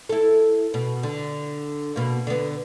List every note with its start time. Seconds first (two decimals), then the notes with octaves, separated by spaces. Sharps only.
0.09 E4 A4
0.74 B2
1.03 D3
1.96 B2 A#3
2.27 D3 B3